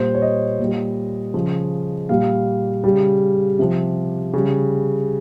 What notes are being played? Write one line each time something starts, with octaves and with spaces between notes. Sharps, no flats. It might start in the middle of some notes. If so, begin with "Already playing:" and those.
Already playing: A#2 G3 C5
C#5
D#5
A#2 G3
C#3 F3
A#2 G3 F5
C#3 G3
C3 F3
C#3 G3